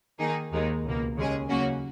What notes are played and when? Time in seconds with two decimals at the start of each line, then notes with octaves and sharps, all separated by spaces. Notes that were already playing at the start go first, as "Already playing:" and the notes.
0.19 D#3 A#3 D#4 G#4
0.52 D#2 D#3 G#3 D#4
0.84 C#2 B2 A#3
1.17 D#2 C#3 G#3 C#4 G#4
1.48 C#3 F#3 A#3 C#4 F#4